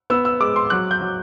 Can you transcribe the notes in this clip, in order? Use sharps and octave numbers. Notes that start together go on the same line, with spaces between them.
B3 E6
E6
G#3 D6
C6
F#3 F#6
G6
F#3